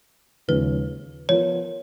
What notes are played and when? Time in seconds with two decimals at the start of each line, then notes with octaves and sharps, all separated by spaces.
0.48 D#2 C#3 F3 G#3 C#4 B4
1.29 F3 B3 F4 A#4 C#5